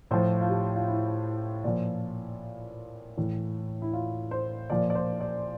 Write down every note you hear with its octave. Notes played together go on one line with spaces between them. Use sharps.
A2 F3 C5
F4
G4
F4
E4
A#2 F3
A2 E3
E4
F4
C5
A#2 F3 D5
D5
C5
D5